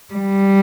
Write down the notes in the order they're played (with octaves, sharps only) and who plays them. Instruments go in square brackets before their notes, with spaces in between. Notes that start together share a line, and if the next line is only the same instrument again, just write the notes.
[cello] G3